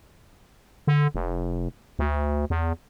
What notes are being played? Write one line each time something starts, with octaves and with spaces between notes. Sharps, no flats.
D3
F1
D2
E2